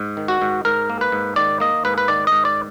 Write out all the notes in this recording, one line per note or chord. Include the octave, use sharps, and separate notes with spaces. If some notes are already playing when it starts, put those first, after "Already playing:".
Already playing: G#2
D#3
F#4
G#2
G#2 A#4
A#3
B4
G#2
D#3 D5
A#3 D#5
G#2 B4
B4
D#3 D5
G#2 D#5
D5